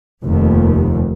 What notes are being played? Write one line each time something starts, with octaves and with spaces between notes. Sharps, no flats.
F1 D#2